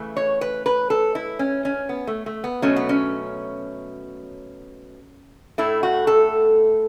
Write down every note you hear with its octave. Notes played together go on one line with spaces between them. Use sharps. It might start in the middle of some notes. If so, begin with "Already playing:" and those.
Already playing: C#3 E3 A3
C#5
B4
B4
A4
E4
C#4
C#4
B3
A3
A3
B3
B2 F#3 A3 C#4
B3
C#4
A2 A3 E4
F#4
A4